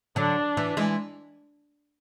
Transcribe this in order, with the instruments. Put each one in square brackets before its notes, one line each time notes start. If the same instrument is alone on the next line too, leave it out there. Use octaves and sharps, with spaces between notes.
[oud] D3 F#3 [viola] D4
[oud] E3
E3 G#3